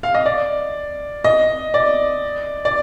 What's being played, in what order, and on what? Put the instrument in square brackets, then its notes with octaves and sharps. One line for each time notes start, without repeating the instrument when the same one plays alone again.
[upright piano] F5
D#5
D5
D#5
D5
D5